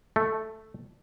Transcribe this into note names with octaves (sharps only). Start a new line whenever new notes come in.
A3